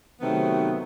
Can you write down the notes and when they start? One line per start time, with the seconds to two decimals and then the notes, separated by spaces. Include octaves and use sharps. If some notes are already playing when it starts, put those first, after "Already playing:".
0.21 C3 D#3 F#3 A3 B3 C4